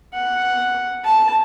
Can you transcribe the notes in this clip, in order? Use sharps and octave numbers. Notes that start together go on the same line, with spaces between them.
F#5
A5